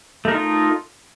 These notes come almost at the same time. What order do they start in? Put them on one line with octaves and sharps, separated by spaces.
A3 A#4 D#4 F4